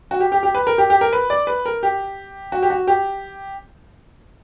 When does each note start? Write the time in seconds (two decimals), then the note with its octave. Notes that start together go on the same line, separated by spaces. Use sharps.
0.11 F#4
0.20 G4
0.32 G4
0.43 G4
0.55 B4
0.67 A#4
0.78 G4
0.90 G4
1.01 A#4
1.13 B4
1.30 D5
1.47 B4
1.66 A#4
1.83 G4
2.52 F#4
2.62 G4
2.70 F#4
2.87 G4